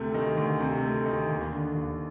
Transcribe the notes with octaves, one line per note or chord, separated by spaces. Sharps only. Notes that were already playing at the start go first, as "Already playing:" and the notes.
Already playing: D2 C3 A3
D#3
D2
C3
A3
D#3
D#2
D3
D#2